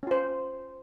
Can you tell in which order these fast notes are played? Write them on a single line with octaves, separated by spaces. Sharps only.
C#4 F4 C5